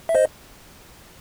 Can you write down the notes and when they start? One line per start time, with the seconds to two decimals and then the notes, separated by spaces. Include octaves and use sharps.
0.09 E5
0.15 C5 D#5